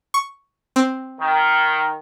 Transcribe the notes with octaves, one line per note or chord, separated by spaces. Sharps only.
C#6
C4
D#3